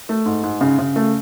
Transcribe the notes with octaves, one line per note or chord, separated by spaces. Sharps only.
A3
G#2
G#2
C#3
C#3
A3